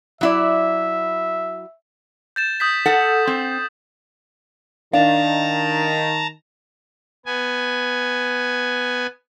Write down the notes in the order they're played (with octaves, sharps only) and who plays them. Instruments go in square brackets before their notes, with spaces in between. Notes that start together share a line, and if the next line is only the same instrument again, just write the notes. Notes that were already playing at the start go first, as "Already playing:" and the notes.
[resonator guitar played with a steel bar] F#3 E4 D5 [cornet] E5
[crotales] G6 A6 E7
D#6 G6 B6
[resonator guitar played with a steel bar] A4 F#5
C4
[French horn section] D#3 [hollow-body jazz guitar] D4 [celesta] F5 [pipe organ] A5 A#5
[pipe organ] B3 G#5